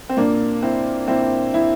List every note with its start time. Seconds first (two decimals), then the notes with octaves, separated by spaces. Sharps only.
0.09 C4
0.17 A#2 A#3 D4
0.62 C4 E4
1.08 A#2 C4 E4
1.54 E4